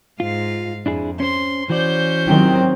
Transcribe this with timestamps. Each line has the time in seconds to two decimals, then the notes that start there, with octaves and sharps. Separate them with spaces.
0.20 G#2 F4 F5
0.86 F2 D4 E4 G#4
1.20 C#4 C5 C6
1.69 E3 C#4 F#4 C5 D5 G6
2.28 D#3 F#3 C4 E4 G4 G5